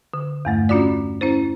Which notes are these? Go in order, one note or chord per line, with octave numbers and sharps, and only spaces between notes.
D3
E2 G2 A3
C#4 D4 F4 F#4 D5
C#4 E4 C5